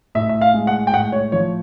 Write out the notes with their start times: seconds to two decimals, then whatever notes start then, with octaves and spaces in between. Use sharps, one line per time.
0.15 A2 E5
0.29 E5
0.41 F5
0.54 G#3
0.67 F#5
0.87 G5
0.93 A2 F#5
1.12 C#5
1.32 F3 C#5